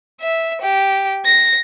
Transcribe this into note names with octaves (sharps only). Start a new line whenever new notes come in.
E5
G4
A#6